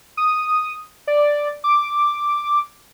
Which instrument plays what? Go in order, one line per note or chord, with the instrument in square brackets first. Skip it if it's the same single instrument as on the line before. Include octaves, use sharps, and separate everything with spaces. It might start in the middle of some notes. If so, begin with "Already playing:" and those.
[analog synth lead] D#6
D5
D6